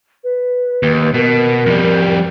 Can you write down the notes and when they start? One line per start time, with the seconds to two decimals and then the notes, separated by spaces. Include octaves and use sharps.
0.24 B4
0.83 D#2
1.14 B2 A#4
1.66 F2 G3